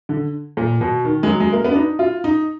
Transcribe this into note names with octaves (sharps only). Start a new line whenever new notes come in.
D3
A#2
B2
D#3
G#3
F#3
G#3
A#3
B3
D4
D#4
F4
D#4